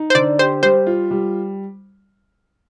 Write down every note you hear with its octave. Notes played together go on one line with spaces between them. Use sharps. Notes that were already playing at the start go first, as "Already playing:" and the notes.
Already playing: D#4
C5
D3 D5
G4 C5
G3 C5
F4
G3